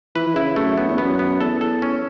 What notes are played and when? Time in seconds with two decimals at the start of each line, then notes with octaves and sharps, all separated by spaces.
0.15 E3 B4
0.27 E3
0.35 C#3 E4
0.56 F#2 A3
0.77 F#2 B3
0.88 E2
0.98 F#2 B3
1.19 B3
1.41 E2 A4
1.61 A4
1.82 C#4